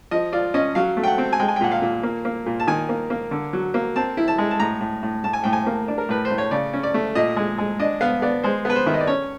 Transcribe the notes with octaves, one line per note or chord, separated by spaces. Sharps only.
F3 D#5
F4 D5
C#4 D#5
F#3 F5
A3
G5
F#5
C4
G#5
G#3 G5
G#5
G5
A#2 F#5
F5
A#2
A#3
A#3
A#2
A5
D#3 G#5
A#3
A#3
D3
F#3
A#3
C4 A5
E4
A5
G#3
A5
A2 A#5
A2
A2
A2 A5
G#5
A2 G5
G#5
A#3
D4
A#4
A2 B4
C5
A2
C#5
C#3 D5
C#4
D5
A3
A#2 D#5
G#3
G#3
D4 D#5
B3 F5
B3 D5
G#3 C5
B3 B4
C5
D#3 E5
D#5
D5
C#4 C#5